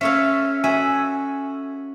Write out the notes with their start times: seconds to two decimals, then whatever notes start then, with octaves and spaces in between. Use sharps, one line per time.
0.01 C#4 A4 C#5 E5 F5
0.64 F#4 A4 E5 G#5